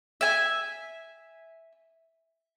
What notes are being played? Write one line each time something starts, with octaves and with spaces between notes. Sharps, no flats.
E5 G#5